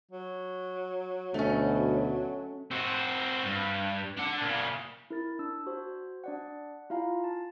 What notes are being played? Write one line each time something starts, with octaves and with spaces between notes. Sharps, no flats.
F#3
D2 B2 A3 C#4
C4 F#4
G2
D4 F#5
A#2 C#3
E4 A#4 A6
D4 E6
F#4 C5
D4 D5 F#5
E4 F4 F5 G#5 A#5
A5